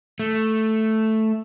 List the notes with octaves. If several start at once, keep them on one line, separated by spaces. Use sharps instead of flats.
A3